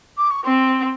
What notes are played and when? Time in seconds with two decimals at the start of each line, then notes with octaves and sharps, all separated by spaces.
0.18 D6
0.31 C#6
0.45 C4 C6